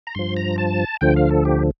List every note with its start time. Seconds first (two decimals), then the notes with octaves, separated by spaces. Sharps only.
0.07 A#5
0.15 G2 F3 C6
0.37 A#5
0.58 A5
1.01 D2 D3 F3 G5
1.16 F5
1.30 A4
1.45 G4